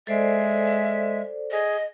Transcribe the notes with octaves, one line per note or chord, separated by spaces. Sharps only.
G#3 A4 C5 D5 E5
G#4 D#5